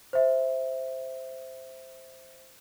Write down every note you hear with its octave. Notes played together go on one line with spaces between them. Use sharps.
C5 E5